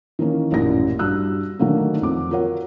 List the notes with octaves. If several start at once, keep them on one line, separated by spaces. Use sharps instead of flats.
D#3 E3 A#3 C#4
A1 F#2 A#2 E4 A#6
G2 F#4 E6 F#6
D3 D#3 F#3 A3 A#3
F2 D6
F4 F#4 A#4 C#5 F#5